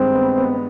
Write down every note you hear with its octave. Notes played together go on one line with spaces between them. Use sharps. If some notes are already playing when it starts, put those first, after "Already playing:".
Already playing: G2 D#3 G#3 C4
B3
B3